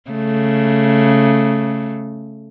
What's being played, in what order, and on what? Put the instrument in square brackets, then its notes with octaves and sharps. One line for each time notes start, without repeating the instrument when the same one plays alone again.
[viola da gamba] C#3 A3